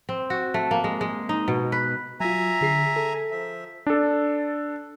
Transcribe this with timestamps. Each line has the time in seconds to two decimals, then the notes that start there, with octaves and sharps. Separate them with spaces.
0.09 C4
0.30 F#4
0.54 A3
0.71 A#3
0.84 G#3
1.01 G#3
1.29 D#4
1.48 B2
1.72 B4
2.20 F#3 F4 E5 G#5 A#5
2.61 D3 G#4 C7
2.96 A4
3.31 F3 E5
3.87 D4 A4